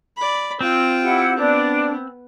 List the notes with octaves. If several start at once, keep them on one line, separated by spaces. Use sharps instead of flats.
D5 B5
C4 F4 G5
E4 G4 F#5
B3 D4